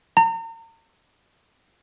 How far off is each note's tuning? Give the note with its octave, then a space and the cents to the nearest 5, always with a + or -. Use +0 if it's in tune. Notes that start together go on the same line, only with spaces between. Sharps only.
A#5 -40